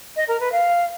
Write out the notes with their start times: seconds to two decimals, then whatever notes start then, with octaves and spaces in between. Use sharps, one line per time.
0.16 D#5
0.28 A#4
0.40 B4
0.52 F5